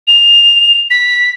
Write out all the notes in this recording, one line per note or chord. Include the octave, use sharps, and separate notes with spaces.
F7
B6